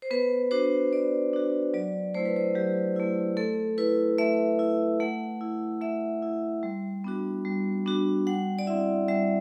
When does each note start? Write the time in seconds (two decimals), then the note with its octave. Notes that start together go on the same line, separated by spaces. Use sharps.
0.02 C5
0.11 B3 B4
0.51 D4 F#4 C5
0.92 B3 D5
1.33 D4 F#4
1.74 F#3 D5
2.14 A3 E4 C5
2.25 B4
2.36 C5
2.55 F#3 G4
2.96 A3 E4
3.37 A3 A4
3.78 E4 B4
4.18 A3 E5
4.59 E4
5.00 A3 F#5
5.41 E4
5.81 A3 E5
6.22 E4
6.63 G3
7.04 B3 D4 F#4
7.45 G3
7.86 B3 D4 F#4
8.27 G3 F#5
8.59 D5
8.67 C4 E4 E5
9.08 G3 E5